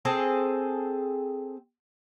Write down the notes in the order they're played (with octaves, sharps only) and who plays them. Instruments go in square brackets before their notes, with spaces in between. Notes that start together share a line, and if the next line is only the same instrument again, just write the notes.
[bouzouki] C4 G#4 A4